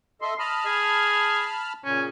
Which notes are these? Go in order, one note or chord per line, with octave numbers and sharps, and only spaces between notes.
A4 D#5 E5 C6
D#5 A5 B5 F6
G#4
A#2 C#3 C#4